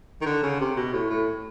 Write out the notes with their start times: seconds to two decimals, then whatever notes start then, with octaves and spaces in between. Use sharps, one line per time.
0.21 D#3
0.26 D3
0.43 C#3
0.60 C3
0.76 B2
0.93 A2
1.09 A2